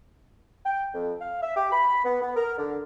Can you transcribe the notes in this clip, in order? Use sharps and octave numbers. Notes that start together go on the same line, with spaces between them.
G5
F2
F5
E5
G4
B5
B3
B3
A#4
D3